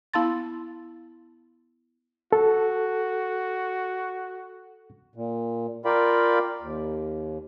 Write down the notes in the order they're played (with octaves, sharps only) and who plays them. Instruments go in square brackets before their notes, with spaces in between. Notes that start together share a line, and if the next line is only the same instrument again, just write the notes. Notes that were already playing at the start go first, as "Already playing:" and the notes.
[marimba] B3 E4 F5 A5 C6 A6
[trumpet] F#4 [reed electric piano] A4
[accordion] A#2
F4 A#4 D5 F5 G5 B5
D#2